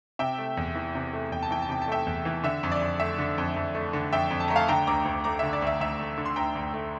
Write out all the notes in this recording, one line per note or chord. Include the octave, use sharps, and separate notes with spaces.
C3 E5 G5
A3
E2
E3
C3
A3
E2 G5
A5
E3 G5
A5
C3 G5
A5
A3 E5 G5
E2
E3
D3 E5
F2
D5
F2
A3 E5
D3
F2
F2
A3
D3
F2 E5 G5
F2
A5
A3 A#5
F5 A5
D3 G5 A#5
D2 A#5 D6
D2
A3 A#5 D6
D3 E5
D5
D2 E5
D2 E5
A3
D3
C6
D2 G5 A#5
D2
A3